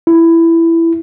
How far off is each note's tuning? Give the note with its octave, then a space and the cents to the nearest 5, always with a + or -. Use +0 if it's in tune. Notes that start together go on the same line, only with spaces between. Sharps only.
E4 +10